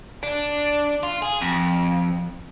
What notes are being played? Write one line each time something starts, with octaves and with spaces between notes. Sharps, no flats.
D4
F4
G#4
F2